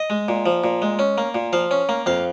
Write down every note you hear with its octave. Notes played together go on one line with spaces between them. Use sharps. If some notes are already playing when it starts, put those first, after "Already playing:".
Already playing: D#5
G#3
A#2
F3
A#2
G#3
C#4
A#3
A#2
F3 F5
C#4
A#3
F2 F5